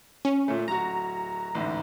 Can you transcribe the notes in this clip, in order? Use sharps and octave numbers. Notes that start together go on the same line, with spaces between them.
C#4
A#2 A3
D1 F#4 A#5
A1 D2 G#2